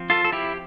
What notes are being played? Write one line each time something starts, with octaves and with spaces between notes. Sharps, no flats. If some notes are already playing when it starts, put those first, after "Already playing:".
Already playing: F3 C4
F4 A4
A4
E4 G4